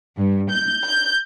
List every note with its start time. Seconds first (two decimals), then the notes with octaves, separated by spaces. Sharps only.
0.17 G2
0.50 G6
0.87 G6